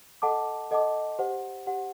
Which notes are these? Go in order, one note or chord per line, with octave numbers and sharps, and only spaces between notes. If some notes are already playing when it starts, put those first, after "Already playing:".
A4 D#5 F#5 A5 D6
A4 D#5 F#5 A5 D6
G4 C5 F#5
G4 C5 F#5